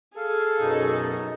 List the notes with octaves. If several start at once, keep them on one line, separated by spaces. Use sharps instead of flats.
G#4 A4 F5
F#2 B2 D#4